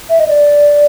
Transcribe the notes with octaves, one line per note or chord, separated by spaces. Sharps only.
E5
D#5
D5